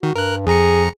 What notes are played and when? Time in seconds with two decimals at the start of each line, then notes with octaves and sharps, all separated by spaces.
0.03 D#3 F#4
0.16 G2 A#4 F#6
0.47 F2 G#4 A#5 C#7